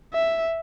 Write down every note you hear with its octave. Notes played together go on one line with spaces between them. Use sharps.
E5